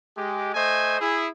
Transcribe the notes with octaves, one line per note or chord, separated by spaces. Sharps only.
G#3 G4
A3 C5 D#5 G#5
E4 G#4